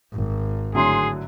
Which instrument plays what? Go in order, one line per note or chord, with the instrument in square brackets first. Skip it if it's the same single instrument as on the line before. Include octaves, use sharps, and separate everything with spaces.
[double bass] G#1
[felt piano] A2 D3 F#3 [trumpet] G#4 [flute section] C6